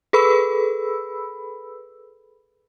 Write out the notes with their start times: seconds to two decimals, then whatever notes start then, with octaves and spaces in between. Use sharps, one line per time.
0.13 G#4 A4 B4 B5 E6